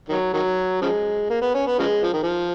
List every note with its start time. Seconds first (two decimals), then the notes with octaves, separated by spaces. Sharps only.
0.09 D#3 F#3
0.33 D#3 F#3
0.82 C#3 F3 G#3
1.30 A#3
1.42 B3
1.54 C#4
1.67 B3
1.79 C#3 F3 G#3
2.03 F3
2.13 D#3
2.23 F3